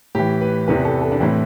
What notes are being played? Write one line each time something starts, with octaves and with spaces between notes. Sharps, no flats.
A2 E3 G4
B4
E2 C3 E3 B4
A4
A4
D4
A2 E3 C4